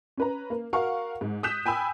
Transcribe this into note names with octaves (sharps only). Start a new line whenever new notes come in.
C#4 B4 A#5
A#3
F#4 A#4 F5 F#5 C#6
G#2
D#6 F#6 G6 B6 E7
G5 G#5 B5 E6